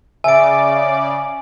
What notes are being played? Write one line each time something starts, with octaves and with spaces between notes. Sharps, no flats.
C#3 D5 E5 G#5 D6 D7